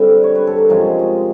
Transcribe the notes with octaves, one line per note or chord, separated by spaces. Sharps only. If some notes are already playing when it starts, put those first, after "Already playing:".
Already playing: D3 G3 C4 E5
D5
C#5
B4
A4
A#4
C3 F3 G#3 C#4 A#4
D#5